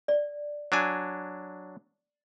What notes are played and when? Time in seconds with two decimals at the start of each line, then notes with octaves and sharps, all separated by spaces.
0.08 D5
0.72 F#3 D4 G#5